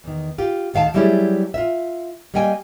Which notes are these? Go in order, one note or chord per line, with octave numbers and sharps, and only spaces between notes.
E2 D#3
F4 G4
D2 D#3 F5 G5 A5
F#3 G3 A3 E4 G4 G#4
F4 E5
G3 A#3 D#5 G5 G#5